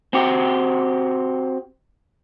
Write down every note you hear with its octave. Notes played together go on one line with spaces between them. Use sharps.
C4 F#4 G4